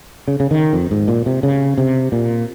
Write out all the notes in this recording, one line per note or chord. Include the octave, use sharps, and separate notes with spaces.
C#3
C#3
D#3
F2
G#2
A#2
C3
C#3
C3
A#2